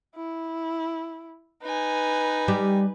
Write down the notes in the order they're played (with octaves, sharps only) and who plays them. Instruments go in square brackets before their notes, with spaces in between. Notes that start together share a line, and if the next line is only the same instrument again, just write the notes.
[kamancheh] E4
[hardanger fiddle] D#4 G#5 [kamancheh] B4
[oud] G3 G4